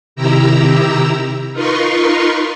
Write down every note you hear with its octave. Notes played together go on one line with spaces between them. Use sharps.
C3 D#3 E4 G4 A#5 E6
D#4 F4 A#4 B4 C6 C#6